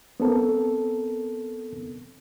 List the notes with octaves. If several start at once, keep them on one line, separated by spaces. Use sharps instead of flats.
B3 C4 A4 A#4